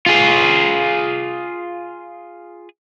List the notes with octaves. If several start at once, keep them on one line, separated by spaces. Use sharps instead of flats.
F4 G#4